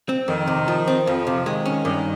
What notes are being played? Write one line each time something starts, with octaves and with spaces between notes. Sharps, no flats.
C4
F2 D#3
C3
F3
C4
F2 F3
C3
D#3 G#3
C#4
G2 D#3